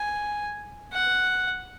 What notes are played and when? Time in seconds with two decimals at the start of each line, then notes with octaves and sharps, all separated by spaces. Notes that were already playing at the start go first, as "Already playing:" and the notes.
Already playing: G#5
0.93 F#5